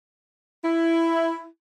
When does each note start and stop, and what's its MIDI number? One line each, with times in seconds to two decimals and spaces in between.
0.63 1.45 64